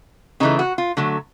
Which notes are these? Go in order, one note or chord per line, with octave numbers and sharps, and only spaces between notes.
C#3 E3 A3 D#4
F#4
F4
D3 F#3 A3